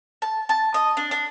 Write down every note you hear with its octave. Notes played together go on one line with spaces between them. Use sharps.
A5
A5
D#5
D4
D4